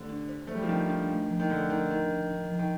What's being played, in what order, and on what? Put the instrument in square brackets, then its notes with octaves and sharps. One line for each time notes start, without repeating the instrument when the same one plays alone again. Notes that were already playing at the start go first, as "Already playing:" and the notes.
Already playing: [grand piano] D3 [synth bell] A3 G4 C5
[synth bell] D4
C5
[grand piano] A3 [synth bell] C5
[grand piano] G3
F3
[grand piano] D#3 [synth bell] D4
[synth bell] D4
A3
F3
[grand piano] D#3
[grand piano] D3 [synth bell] A3
[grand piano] D#3 [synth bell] F3
[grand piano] D#3 [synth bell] D4
[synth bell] D4
D4
F3
[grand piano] D#3